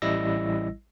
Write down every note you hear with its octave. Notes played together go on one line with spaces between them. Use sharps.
A1 G3 E4 D#5 E6 A#6